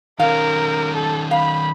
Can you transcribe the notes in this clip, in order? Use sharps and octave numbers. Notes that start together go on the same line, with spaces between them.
D#3 C#4 A#4 F5
A4
F5 B5